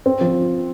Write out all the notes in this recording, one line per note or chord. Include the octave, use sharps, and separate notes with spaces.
C4
F3